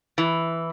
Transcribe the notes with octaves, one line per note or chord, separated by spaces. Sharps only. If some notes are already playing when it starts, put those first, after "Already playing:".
E3